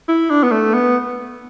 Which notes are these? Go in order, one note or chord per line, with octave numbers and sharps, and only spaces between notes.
E4
D4
B3
A3
B3